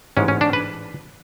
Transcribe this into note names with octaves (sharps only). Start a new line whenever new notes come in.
A1 G#2 G#3 C#4
C#4
D4
B4